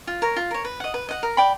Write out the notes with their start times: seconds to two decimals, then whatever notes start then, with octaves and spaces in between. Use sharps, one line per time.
0.07 F4
0.22 A#4 C#5
0.36 F4
0.51 A#4 C#5
0.65 B4
0.80 D#5 F#5
0.94 B4
1.09 D#5 F#5
1.23 A#4
1.37 D5 G5 B5